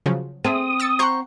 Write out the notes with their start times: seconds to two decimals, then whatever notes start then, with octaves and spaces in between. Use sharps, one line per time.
0.06 C#3 F3 F#3
0.44 C4 G#4 A4 E5 D#6
0.80 E6 A6 C#7
0.99 C5 F#5 A#5 C6 C#6 G6